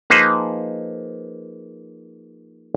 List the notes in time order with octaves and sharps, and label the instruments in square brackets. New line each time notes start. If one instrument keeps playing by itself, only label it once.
[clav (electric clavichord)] F3 A#3 D#4 G#4 B4 C5